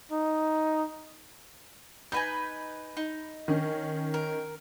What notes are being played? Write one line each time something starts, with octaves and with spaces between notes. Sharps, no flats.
D#4
D#4 B4 G#5 B5 G6
D#4
D#3 C#4
A#4